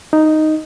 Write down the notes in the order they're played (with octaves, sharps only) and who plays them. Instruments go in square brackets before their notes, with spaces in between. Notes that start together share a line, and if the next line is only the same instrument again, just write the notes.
[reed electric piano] D#4